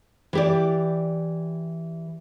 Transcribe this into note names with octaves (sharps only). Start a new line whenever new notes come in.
E3 G4 D5